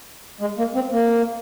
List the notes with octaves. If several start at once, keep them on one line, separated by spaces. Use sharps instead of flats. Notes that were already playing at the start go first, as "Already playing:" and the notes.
G#3
A#3
C4
A#3